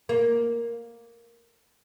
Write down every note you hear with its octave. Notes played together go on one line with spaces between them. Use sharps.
A#3